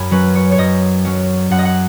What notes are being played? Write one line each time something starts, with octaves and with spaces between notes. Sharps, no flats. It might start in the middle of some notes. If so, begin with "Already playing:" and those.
Already playing: F#2 G#5 B5
F#3 C#4 B4
C#5
C#5
F#2 D#5
F#3 C#4
F#2 F#5
D#5
F#5